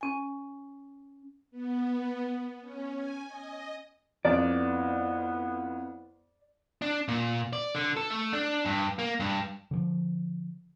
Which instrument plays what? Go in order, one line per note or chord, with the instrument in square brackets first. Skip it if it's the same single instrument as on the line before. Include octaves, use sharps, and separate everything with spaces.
[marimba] C#4 G#5
[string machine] B3
C#4
G#5
D#5
[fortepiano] F2 [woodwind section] B3 E4 [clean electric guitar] D5
[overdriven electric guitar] D4
A#2
D5
D3
A4
A3
D4
G2
A#3
G2
[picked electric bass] D3 F3